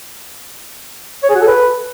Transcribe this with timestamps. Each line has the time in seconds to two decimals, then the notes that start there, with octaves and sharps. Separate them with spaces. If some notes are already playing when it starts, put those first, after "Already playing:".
1.23 C#5
1.29 G#4
1.35 F#4
1.41 A4
1.47 B4